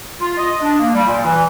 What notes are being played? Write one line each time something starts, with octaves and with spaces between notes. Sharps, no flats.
F4
D#5
D4
A#3
G3
A#2
E3